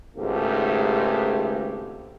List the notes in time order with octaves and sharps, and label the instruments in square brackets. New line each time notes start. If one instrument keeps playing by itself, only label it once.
[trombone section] G#1 C#2 G#2 A3 G4